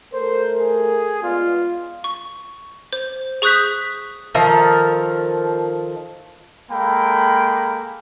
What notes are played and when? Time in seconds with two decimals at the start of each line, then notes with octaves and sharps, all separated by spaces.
0.13 A3 A4 A#4 C5
0.59 G#4
1.23 G#3 B3 F4 D5
2.04 C#6
2.93 C5
3.42 G#4 C#6 D#6 F#6 G6 B6
4.34 D#3 F3 A4 A#4
6.71 G#3 A#3 A4 G5 B5